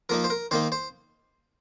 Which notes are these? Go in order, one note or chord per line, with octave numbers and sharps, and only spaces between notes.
F3 A#3 D#4 A#4
C5
A#4
D#3 A#3 D#4 C5
C5